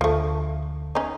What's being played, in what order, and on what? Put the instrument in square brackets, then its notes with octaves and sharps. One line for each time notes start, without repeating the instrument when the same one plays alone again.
[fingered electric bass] D2 [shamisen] F3 A3
[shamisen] C#4 D#4